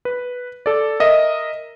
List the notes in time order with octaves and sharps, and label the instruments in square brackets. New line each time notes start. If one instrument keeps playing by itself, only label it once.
[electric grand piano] B4
A4 D5
A#4 D#5 E5